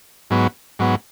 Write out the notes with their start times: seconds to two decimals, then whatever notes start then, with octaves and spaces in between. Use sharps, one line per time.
0.30 G#2 F#3 B3
0.79 G#2 F#3 B3